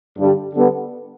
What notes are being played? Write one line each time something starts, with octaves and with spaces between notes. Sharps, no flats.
G2 D3 G3
D3 G3 B3